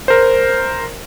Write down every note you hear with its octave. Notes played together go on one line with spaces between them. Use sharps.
A#4 C5